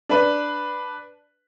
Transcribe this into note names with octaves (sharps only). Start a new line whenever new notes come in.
D4 B4